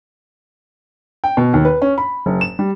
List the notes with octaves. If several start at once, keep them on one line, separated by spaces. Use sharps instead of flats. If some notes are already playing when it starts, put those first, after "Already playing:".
G5
B2
D#2
B4
C#4
B5
F#1
E7
G3